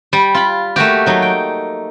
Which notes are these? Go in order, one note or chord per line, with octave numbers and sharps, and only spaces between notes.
G3
F4 B5
A3 A#3 F#4 G4
F#3 D#4
G5